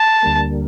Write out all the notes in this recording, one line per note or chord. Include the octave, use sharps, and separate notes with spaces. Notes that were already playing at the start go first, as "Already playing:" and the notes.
Already playing: A5
D2 D3 G3 A#3